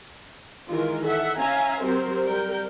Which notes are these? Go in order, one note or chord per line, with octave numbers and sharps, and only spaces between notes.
D#3 E3 G#3 F4 A#4
A4 E5 F#5
C#4 E5 F5 G#5 A#5
F#3 C4 G4 A#4 C5
G3 A#4 G5